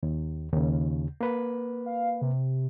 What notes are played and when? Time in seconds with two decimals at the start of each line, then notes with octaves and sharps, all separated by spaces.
0.03 D#2
0.52 D#2 C#3
1.21 A#3 B4
1.86 F5
2.21 C3